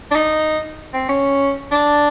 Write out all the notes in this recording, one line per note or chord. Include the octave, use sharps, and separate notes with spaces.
D4
D#4
C4
C#4
D4